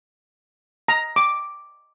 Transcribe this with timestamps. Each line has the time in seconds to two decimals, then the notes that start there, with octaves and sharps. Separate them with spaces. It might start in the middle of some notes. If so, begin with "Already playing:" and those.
0.88 A#5
1.16 D6